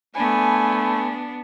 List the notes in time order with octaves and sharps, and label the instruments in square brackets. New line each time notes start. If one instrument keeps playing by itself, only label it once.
[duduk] A3 [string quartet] B3 D4 [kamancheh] G#5 [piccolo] B5